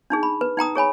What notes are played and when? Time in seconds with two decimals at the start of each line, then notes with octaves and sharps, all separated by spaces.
0.10 D4 D#4 G#4
0.23 B5
0.41 B4
0.57 D#4 G5 A#5 D#6
0.75 G#4 C#5 G#5 B5